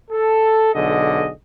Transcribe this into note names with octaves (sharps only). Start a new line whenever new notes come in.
A4
B1 D3 G#4 D#5